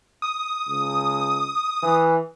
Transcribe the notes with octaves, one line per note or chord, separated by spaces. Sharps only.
D#6
C#2
E3